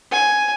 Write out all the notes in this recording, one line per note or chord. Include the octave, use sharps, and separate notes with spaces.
G#5